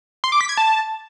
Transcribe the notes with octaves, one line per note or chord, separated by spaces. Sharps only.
C6
D6
B6
G#6
A5